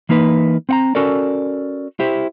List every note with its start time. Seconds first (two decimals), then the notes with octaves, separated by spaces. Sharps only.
0.09 E3 A#3 D#4 B4
0.69 C4 F#5 A#5
0.95 C#4 F#4 A4 A#4 D5
2.00 E4 G4 C5